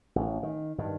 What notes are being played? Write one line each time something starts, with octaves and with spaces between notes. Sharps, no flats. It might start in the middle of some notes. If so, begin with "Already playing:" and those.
A1
D#3
G2 D#3